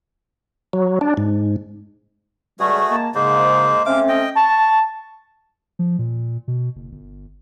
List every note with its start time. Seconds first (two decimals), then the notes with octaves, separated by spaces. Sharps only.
0.73 F#3
1.01 D4
1.17 G#2
2.60 C#2 G3 A3 F#4 G#4
2.90 G#3 A#3 A5
3.15 G#2 C#3 G#3 A#3 C5
3.86 A3 C4 C#4 F5 D6
4.08 D#5 G5
4.36 A5 C#6
5.79 F3
5.99 A#2
6.48 B2
6.76 F#1
6.92 G1